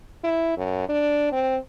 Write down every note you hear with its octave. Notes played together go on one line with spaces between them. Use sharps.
E4
F#2
D4
C4